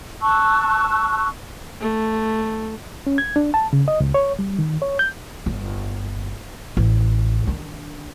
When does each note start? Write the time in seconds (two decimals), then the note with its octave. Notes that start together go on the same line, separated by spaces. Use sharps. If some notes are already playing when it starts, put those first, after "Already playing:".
0.21 A5 C#6 E6 F#6
1.81 A3
3.07 C#4
3.18 G#6
3.36 D4
3.54 A5
3.73 C#3
3.88 D#5
4.00 C#2
4.14 C#5
4.39 G3
4.59 D#3
4.82 C#5
4.99 G6
5.46 G1
6.77 A1
7.47 D#3 D4